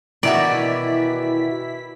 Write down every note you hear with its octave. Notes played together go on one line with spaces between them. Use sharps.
B2 D#3 E3 E4 F#4 D5 B6